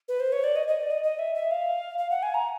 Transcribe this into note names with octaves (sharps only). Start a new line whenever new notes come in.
B4
C5
C#5
D5
D#5
D#5
D5
D#5
D#5
E5
E5
F5
F5
F#5
G#5
A#5